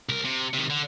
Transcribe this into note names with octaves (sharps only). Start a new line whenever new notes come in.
C2 A#4
C3
C3 D#3
D3